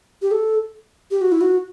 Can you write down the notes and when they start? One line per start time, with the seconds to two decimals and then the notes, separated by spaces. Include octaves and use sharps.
0.22 G4
0.31 A4
1.11 G4
1.21 F#4
1.32 E4
1.41 F#4